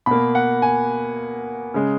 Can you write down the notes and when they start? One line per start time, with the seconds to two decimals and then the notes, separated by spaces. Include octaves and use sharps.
0.06 B2 A#3 B5
0.35 F#5
0.62 G#5
1.74 C#3 G#3